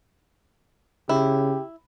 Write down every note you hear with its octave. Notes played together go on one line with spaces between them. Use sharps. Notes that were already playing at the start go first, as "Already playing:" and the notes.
C#3 E4 G4